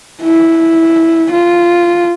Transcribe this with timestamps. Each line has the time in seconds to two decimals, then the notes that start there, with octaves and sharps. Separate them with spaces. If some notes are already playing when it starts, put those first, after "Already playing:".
0.22 E4
1.31 F4